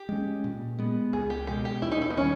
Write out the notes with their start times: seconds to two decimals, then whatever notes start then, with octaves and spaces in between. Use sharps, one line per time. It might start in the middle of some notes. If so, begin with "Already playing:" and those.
Already playing: G4
0.09 G#3 C#4
0.44 A#2
0.79 G#3 B3
1.13 C#2 G#4
1.30 G4
1.47 B2 G#3 G4
1.65 G4
1.82 D#2 E4
1.92 D#4
2.02 E4
2.10 B3
2.17 D#3 G3 C#4